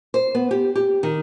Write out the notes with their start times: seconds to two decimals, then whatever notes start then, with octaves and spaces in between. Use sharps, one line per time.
0.14 C5
0.35 B3
0.51 G4
0.76 G4
1.03 D#3